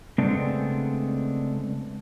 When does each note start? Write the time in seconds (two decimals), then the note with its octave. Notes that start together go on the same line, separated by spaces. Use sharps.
0.18 C#3 G#3 A3 B3 C4 D4